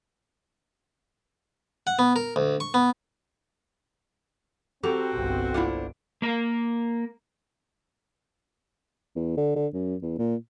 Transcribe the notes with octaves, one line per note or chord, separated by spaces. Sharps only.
F#5
B3
A#4
D2
C#6
B3
C4 F#4 G4 A4 F#5 A#5
G1 C2
A#3 D4 E4 F4 C5 F#5
A#3 A#4
E2
D3
D3
F#2
E2
A#2